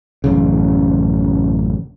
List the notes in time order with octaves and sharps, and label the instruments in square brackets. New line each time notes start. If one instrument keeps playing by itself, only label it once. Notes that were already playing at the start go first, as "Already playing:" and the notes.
[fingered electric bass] A1 F#2 C#3